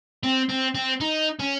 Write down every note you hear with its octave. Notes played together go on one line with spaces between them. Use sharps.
C4
C4
C4
D#4
C#4